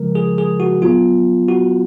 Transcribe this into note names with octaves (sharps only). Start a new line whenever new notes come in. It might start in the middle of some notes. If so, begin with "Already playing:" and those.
Already playing: C#3 F3 G#3 A#4
G#4
G#4
F#4
A#2 F#3 B3 F4
F#4